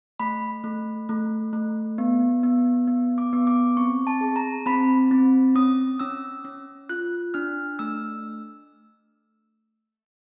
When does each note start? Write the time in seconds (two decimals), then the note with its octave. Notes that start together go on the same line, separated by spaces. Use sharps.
0.20 A3 B5
0.64 A3
1.09 A3
1.53 A3
1.98 B3
2.43 B3
2.88 B3
3.18 D6
3.33 B3
3.47 D6
3.77 C4 C#6
4.07 A5
4.21 G#4
4.36 A#5
4.66 C4 B5
5.11 C4
5.55 C#4 D#6
6.00 C#4 E6
6.45 C#4
6.89 F4 F#6
7.34 D4 F6
7.79 A3 E6